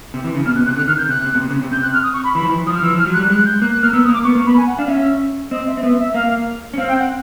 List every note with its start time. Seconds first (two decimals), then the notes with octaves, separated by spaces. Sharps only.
0.14 C3
0.24 E3
0.35 C#3
0.45 B2 F6
0.56 B2 F#6
0.66 C3 F#6
0.77 D3 F#6
0.87 D#3 F6
0.98 G6
1.09 C3 F#6
1.24 C3
1.35 B2
1.40 C3
1.51 C#3
1.62 C3
1.72 C3 G6
1.82 F#6
1.93 F6
2.03 D#6
2.13 C#6
2.24 B5
2.35 E3 B5
2.43 F3
2.50 E3
2.67 F3 D#6
2.75 F6
2.82 E3 E6
2.94 F3 F6
3.06 F#3
3.14 F#6
3.18 G3
3.29 G#3 F#6
3.46 G6
3.61 A#3 F#6
3.72 F#6
3.82 A#3 F6
3.93 B3 E6
4.04 D#6
4.09 A#3
4.14 D6
4.24 B3 C#6
4.35 A#3
4.45 B3 B5
4.57 G#5
4.67 F#5
4.78 D4 F5
4.88 C#4 E5
5.51 C4 D#5
5.67 E5
5.77 C4
5.82 B3 E5
5.99 E5
6.14 A#3 F5
6.74 C#4
6.78 C4 F5
6.88 G5
6.99 F#5